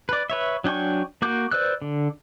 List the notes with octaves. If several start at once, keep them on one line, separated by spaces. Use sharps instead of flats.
B4 D5
B4 C#5 E5
F#3 D4 G5 G#5 C#6
A#3 F#4 D6 G6
B4 C5 D5 E6 F#6
D3